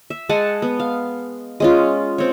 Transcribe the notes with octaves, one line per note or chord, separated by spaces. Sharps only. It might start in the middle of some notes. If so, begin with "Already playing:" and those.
E5
G#3 F#5 G#5 A5
B3
F5
G#3 C#4 F4
C4 C#5